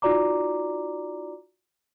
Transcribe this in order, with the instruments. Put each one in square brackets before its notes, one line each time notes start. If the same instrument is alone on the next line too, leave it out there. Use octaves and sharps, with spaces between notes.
[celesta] D#4 F4 F#4 D5 A#5 D6